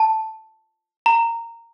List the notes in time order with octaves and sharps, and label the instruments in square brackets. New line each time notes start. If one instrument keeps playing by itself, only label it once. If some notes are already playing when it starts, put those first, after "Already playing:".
Already playing: [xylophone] A5
A#5